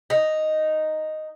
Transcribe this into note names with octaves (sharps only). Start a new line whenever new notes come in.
D#4